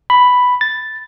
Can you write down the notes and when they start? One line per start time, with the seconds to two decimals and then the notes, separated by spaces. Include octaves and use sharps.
0.10 B5
0.61 A6